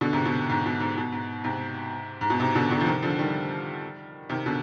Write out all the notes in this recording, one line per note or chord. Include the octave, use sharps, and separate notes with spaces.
B2 D3
G#2 C3
B2
G#2
B2
G#2
B2
G#2
G#2 C3
G#2
B2
G#2 C3
B2 D3
B2 D3
F3
C3 D#3
D3 F3
D#3 G3
C3 D#3
B2 D3